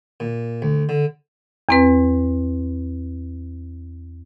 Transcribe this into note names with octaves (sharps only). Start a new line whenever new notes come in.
A#2
D2
D3
E2 C4 B4